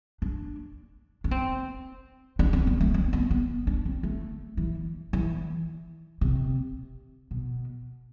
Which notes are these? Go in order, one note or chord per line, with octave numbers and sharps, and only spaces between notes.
D4
D4
C4
D4
C4
B3
A3
C4
B3
B3
D4
C4
A3
E3
E3
C3
B2